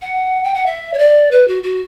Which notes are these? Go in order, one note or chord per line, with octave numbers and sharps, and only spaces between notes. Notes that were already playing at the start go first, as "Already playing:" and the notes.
F#5
G5
F#5
E5
C#5
D5
B4
F#4
F#4